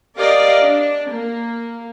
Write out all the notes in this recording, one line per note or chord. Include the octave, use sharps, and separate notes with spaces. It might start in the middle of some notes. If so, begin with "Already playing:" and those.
G4 A#4 D5 D#5 F5
D4
A#3